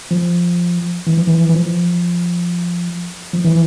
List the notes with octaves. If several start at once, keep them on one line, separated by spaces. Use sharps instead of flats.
F3
E3
F3
E3
E3
F3
F3
E3